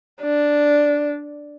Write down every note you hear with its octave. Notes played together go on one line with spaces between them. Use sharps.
D4